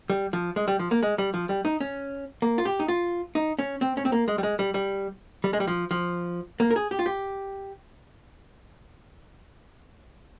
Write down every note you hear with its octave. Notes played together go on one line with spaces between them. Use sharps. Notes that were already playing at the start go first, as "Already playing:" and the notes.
G3
F3
G#3
G3
F3
A#3
G#3
G3
F3
G3
D#4
C#4
A#3
F4
G4
D#4
F4
D#4
C#4
C4
C#4
C4
A#3
G#3
G3
G#3
G3
G3
G3
G#3
G3
F3
F3
A#3
A#4
G#4
G4
F4
G4